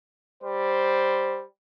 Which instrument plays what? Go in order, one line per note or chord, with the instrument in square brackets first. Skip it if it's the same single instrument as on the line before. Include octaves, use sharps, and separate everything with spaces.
[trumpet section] G3 C5